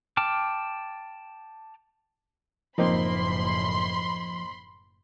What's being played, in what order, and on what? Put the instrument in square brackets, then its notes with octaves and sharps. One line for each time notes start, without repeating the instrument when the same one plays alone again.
[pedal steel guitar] G5 A5 D6 F6
[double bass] F#1 A2 [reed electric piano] F3 [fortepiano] A#3 C4 D#4 [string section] B5 C6